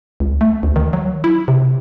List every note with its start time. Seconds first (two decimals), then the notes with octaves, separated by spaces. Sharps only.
0.20 C#2
0.41 A3
0.63 D2
0.76 D#3
0.93 F#3
1.24 E4
1.48 C3